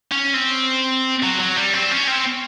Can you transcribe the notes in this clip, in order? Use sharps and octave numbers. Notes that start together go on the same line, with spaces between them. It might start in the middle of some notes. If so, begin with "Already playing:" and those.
C#4
C4
F#3
F#3
G3
C4
C#4
C4